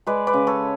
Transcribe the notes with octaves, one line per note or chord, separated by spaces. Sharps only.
G#3 B4 D5
B4 D5
C#3
A4 C#5